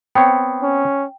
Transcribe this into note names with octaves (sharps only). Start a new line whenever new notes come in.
B3 C4 C#5 G5
C#4